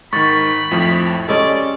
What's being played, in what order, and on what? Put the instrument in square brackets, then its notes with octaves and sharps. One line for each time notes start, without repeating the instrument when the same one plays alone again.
[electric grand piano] G#2 D#3 [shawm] B5 [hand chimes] C#6 A6
[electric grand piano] F2 A2 F3
[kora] G3 G#3 C#4 [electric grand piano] A4 [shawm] D5